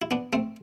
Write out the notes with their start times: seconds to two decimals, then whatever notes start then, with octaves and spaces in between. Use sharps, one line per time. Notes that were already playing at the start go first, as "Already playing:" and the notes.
0.02 E4
0.11 B3 D4
0.33 A3 C4